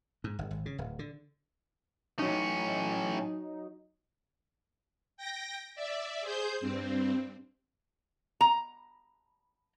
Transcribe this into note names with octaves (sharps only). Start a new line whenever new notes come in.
G#2
G1
G#1
C#3
D1
D3
A2 F#3 C#4 D#4
G5 A#6
D5 E5
G#4 C5 G6
G2 C4
A#5